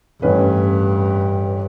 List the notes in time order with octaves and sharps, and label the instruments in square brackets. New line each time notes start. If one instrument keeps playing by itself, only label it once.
[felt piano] A1 C#4 B4 [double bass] G2